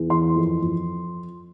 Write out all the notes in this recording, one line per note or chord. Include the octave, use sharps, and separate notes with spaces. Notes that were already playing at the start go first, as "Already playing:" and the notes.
Already playing: E2
E3 C6
F2
F2